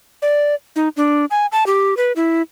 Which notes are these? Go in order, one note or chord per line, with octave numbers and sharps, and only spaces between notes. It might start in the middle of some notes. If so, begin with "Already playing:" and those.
D5
D#4
D4
G#5
A5
G4
B4
E4